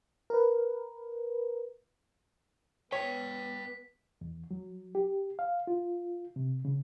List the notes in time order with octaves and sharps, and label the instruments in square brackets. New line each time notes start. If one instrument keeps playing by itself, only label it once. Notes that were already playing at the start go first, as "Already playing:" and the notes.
[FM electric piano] A#4 B4
[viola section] B3 [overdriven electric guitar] B4 G5 [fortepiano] C#5 [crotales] B6
[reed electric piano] E2
F#3
G4
F5
F4
C3
C#3